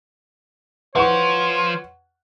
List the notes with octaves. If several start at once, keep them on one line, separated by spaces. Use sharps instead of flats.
F3 B4 C#5 F#5 C#6